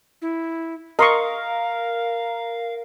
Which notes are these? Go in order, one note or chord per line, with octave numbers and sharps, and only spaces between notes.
E4
A#4 D#5 F5 C6 C#6